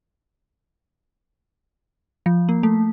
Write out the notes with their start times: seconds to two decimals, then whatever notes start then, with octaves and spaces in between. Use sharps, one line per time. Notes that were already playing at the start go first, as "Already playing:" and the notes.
2.26 F3
2.49 A#3
2.63 A3